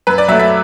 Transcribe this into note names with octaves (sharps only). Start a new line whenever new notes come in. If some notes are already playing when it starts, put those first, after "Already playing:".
F#2 B4
D5
F#3 A3 E5
E5